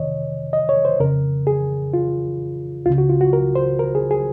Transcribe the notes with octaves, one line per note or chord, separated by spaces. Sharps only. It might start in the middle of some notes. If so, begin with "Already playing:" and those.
Already playing: F2 C3 D#3 C#5 D#5
D#5
C#5
C5
F2 C#3 A#4
G#4
F4
C#2 C#3 F4
F#4
F4
F#4
A#4
C5
A#4
G#4
G#4